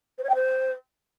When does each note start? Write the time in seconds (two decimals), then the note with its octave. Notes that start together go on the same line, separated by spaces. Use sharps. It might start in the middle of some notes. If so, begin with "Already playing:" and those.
0.18 C5
0.24 C#5
0.29 G5
0.35 C5